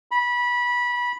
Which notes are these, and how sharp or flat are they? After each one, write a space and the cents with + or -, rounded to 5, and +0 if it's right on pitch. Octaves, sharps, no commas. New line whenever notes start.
B5 -20